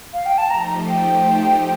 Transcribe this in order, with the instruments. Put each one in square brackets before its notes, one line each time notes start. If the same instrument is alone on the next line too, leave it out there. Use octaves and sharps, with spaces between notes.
[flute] F5
G5
A5
[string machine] F3 A3 D#4 G4 C5 [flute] A#5
[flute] G5